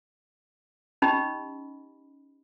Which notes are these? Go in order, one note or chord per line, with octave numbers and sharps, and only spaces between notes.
C#4 D#4 G4 D#5 B5